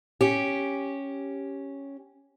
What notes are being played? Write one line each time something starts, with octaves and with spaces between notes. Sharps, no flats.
C#4 G4